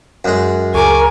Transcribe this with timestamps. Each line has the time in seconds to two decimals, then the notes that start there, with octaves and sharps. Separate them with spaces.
0.25 F#2 G#3
0.74 C#2 G#4 A#4 G#5 C#6 D6